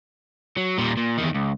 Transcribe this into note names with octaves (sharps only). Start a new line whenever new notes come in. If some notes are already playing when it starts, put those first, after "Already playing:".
F#3
A#2 G3
A#2
E2 D#3
C#2